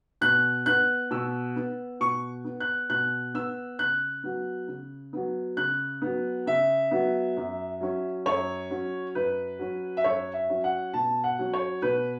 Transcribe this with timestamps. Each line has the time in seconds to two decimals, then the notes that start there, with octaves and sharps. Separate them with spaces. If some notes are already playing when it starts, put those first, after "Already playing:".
0.21 B2 F#6
0.66 B3 F#6
1.11 B2 E6
1.56 B3
2.00 B2 C#6
2.45 B3
2.60 F#6
2.89 B2 F#6
3.34 B3 E6
3.79 C#3 F#6
4.23 F#3 B3
4.68 C#3
5.13 F#3 B3
5.57 C#3 F#6
6.02 F#3 B3
6.46 C#3 E5
6.91 F#3 B3
7.37 F#2
7.81 F#3 C#4
8.26 F#2 C#5
8.70 F#3 C#4
9.15 F#2 B4
9.59 F#3 C#4
9.97 E5
10.04 F#2 C#5
10.33 E5
10.49 F#3 C#4
10.64 F#5
10.94 B2 A5
11.24 F#5
11.39 F#3 C#4
11.53 C#5
11.82 B2 B4